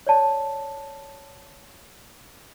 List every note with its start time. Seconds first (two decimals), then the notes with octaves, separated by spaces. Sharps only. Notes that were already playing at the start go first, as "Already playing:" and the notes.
0.07 C#5 D5 A5